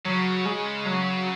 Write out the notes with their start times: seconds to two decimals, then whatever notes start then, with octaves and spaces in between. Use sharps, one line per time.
0.05 C#3 F#3
0.46 G#3
0.86 F#3